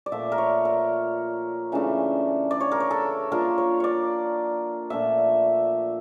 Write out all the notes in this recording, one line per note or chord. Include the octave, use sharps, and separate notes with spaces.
D5
A#2 F3 A3 E5
A#4
C#5
A#4
C#3 E3 A3 D4
D5
C#5
A#4
C#5
A4
F3 A#3 D4 F4 A#4
C#5
C#5 D5
A#2 F3 A3 D4 E5